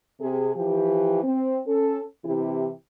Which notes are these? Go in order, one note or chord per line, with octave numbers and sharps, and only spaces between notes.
C3 G#4
E3 F3 G4
C4
C#4 A4
C3 E3 E4 G4